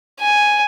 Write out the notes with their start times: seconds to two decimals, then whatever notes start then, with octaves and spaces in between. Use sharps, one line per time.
0.20 G#5